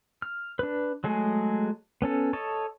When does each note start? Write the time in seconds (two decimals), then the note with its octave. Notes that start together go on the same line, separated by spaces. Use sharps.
0.22 F6
0.59 D4 B4
1.04 F#3 G#3 A3 G#4
2.02 B3 C#4 A4
2.33 A4 C#5 D#5 A5